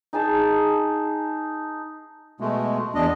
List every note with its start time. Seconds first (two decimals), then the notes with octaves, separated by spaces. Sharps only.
0.13 D#4 G#4 G#5 A5
2.40 B2 G#3 A3
2.95 E2 D4 D#5